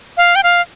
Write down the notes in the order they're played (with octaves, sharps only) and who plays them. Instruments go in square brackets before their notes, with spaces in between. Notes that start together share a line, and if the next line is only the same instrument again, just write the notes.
[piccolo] F5
G5
F5